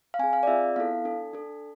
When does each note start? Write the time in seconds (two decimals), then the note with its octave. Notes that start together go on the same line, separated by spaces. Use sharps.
0.14 F5
0.19 C4 G#4 G#5
0.33 F5
0.43 D5
0.47 C4 F4 G#4 E5
0.76 B3 E4 A4 F5
1.05 D4 A4
1.33 D4 A4